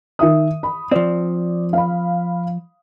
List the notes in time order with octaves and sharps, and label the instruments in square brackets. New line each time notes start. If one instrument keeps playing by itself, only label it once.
[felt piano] D#3 E5 D#6
B5
[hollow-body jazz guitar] F3 C4 [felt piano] D5
[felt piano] F5 B5